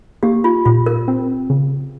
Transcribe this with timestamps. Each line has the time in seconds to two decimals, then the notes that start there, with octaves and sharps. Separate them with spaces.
0.23 A#3 G4
0.44 F4
0.65 A#2 F4
0.86 A#4
1.08 C4
1.50 C#3